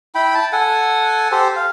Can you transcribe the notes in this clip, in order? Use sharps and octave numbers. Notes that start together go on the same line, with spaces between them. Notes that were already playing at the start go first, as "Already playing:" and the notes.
E4 G5 B5
A5
A4 F#5 G#5
G4 A4 C5
F5